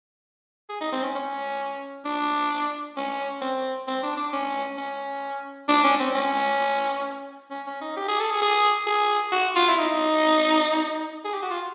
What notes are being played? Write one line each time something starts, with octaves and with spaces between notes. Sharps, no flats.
G#4
D#4
C4
C#4
C#4
D4
C#4
C4
C4
D4
D4
C#4
C#4
D4
C#4
C4
C#4
C#4
C#4
D#4
G4
G#4
A4
G#4
G#4
G#4
F#4
F4
E4
D#4
G#4
G4
F#4
F4